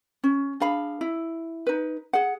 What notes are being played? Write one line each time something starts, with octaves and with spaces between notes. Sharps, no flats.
C#4
D4 G#4 F5 B5
E4
D#4 B4
G#4 F#5